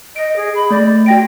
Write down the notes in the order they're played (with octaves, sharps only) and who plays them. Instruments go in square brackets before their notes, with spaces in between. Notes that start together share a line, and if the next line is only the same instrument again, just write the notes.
[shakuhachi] D#5 [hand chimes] D7
[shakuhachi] G#4
B5
[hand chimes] A3 [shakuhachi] D5
[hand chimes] F#4 A#6 D7 [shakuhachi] G5